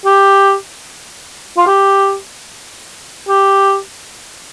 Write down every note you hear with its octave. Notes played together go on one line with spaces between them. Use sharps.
G4
F4
G4
G4